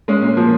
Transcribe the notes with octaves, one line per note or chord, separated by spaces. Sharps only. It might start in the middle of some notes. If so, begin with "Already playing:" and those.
G#3 C#4
A#2
F3 A#3